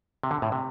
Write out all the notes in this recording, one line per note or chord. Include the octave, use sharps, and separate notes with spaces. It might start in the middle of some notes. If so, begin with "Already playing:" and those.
C3
D3
A2
C3